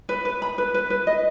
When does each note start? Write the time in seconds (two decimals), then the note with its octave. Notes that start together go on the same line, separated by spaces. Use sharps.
0.09 B4
0.25 B4
0.42 B5
0.58 B4
0.74 B4
0.90 B4
1.07 D#5